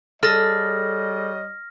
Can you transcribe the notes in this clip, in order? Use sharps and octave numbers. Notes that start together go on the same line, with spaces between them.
G3 G#4 A4 C#5 D#5 F6 A#6